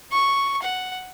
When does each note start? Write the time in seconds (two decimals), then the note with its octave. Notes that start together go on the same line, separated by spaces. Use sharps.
0.12 C#6
0.62 F#5